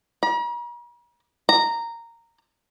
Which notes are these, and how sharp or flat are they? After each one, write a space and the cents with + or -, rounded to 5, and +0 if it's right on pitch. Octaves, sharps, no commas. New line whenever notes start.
A#5 +45
A#5 -10